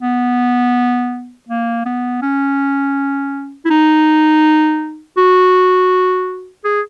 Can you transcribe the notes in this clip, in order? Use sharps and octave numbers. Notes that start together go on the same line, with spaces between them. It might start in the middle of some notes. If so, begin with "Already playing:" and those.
B3
A#3
B3
C#4
E4
D#4
F#4
G#4